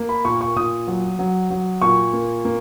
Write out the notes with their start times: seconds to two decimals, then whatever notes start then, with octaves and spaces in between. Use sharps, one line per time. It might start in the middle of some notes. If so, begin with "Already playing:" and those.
Already playing: A#3
0.09 B5
0.25 A#2 C#6
0.41 C#6
0.56 A#2 D#6
0.87 F#3
1.19 F#3
1.50 F#3
1.82 A#2 C#6
2.13 A#3
2.45 A#3